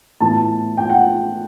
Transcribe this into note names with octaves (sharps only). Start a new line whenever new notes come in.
A2 E3 B3 A5
G5
F#5